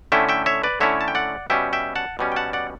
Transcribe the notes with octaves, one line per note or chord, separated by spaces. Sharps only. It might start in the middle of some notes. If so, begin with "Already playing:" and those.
D3 A3 C#4 E4 E5 G5
E5 G5
C#5 E5
B4 D5
D3 A3 C#4 E4 C#5 E5
A5
G5
D5 F#5
B2 G3 C#4 E5 G5
E5 G5
F#5 A5
B2 G3 C#4
G5
F#5 A5
D5 F#5